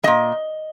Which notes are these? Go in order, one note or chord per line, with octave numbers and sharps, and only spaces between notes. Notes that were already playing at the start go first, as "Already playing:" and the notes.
A#2 G3 D#5